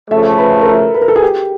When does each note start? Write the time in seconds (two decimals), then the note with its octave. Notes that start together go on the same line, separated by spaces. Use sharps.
0.11 C#3 F3 A3 E5
0.38 B4
0.61 A#4
0.67 A4
0.94 B4
1.01 A#4
1.08 A4
1.16 G#4
1.22 G4